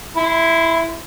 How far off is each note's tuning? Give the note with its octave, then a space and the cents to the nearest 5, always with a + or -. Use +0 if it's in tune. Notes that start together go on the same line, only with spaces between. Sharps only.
E4 +0 C6 -35